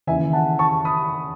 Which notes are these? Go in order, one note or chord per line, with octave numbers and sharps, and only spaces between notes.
D#2 C#3 E3 E5 G#5
F#5 A5
A5 C#6
B5 D#6